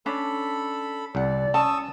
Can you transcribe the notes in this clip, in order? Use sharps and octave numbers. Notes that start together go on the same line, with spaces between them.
C#4 D4 A4 B5
C2 D5 F#5
C#4 A5 C#6 D#6 E6